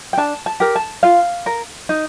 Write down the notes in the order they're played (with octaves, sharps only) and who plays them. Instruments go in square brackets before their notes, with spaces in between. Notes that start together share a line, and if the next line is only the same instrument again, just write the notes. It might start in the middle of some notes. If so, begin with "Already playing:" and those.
[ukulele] G5
D4 A5
A5
G4 A#4
A5
F4 F5
A#4
D#4